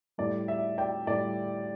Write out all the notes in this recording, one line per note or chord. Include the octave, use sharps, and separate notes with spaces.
A2 G3 D5
E5
D5 G5
A2 G3 D5